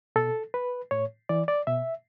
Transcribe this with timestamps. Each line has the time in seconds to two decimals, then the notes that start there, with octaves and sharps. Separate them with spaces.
0.16 B2 A4
0.54 B4
0.91 A2 C#5
1.29 E3 D5
1.48 D5
1.67 B2 E5